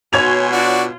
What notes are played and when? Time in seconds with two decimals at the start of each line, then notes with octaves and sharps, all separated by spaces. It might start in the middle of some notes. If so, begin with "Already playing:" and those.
0.13 B2 F#4 C#5 G#5 C6 G#6 F7
0.52 D4 F4 F#4